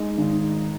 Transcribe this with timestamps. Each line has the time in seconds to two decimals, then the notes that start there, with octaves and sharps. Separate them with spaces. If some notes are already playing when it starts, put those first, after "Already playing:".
Already playing: G#3 D#4
0.18 G#1